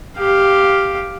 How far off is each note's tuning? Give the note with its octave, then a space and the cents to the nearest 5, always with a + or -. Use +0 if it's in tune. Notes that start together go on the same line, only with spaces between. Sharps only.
G4 +0 F5 +0